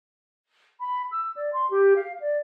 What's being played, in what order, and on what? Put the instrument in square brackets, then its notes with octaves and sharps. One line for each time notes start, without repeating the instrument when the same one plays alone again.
[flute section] B5
E6
D5
C6
G4
F5
D5